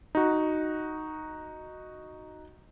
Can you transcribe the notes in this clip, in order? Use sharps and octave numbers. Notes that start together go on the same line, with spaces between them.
D#4 F#4